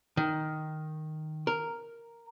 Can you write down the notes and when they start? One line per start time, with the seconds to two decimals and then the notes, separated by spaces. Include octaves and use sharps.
0.17 D#3
1.47 A#4